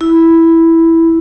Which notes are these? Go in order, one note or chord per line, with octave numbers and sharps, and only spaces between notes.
E4